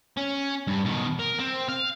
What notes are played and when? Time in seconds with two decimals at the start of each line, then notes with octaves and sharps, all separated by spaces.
0.17 C#4
0.67 G2
0.85 B2 D#3
1.19 A#4
1.38 C4
1.69 F5